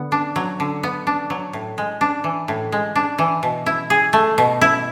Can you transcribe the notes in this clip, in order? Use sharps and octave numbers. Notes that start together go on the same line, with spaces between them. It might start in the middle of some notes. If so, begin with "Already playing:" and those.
Already playing: D3 B3
D4
F#3
D3
B3
D4
F#3
A2
G#3
D4
E3
A2
G#3
D4
E3
B2
E4
G#4
A3
B2
E4